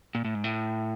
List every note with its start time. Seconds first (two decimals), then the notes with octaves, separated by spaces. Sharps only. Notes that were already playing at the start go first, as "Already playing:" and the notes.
0.15 A#2
0.25 A2
0.35 G#2
0.44 A2